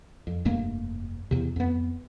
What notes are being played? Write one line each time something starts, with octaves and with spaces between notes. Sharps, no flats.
F2
F1 G2 A3 A#3
E2 C3
F2 B3